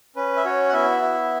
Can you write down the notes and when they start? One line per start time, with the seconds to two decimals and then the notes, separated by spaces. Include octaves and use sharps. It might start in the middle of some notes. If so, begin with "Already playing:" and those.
0.16 C#4 B4
0.37 E5
0.45 F#4 C#5
0.69 F#5
0.73 B3 E4 E5
1.02 E4